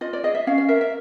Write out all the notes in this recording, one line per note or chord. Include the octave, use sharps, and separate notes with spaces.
F4 D#5
D5
G#4 D#5
E5
C#4 F5
F5
A#4 E5
E5